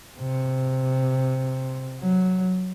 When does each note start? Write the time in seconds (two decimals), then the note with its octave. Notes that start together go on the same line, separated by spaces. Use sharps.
0.20 C3
2.00 F#3